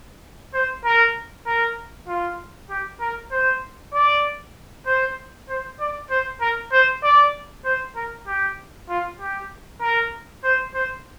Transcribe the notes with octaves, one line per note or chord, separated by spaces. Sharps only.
C5
A#4
A#4
F4
G4
A#4
C5
D5
C5
C5
D5
C5
A#4
C5
D5
C5
A#4
G4
F4
G4
A#4
C5
C5